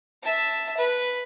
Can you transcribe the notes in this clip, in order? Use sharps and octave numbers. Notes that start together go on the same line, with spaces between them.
E5 A5
B4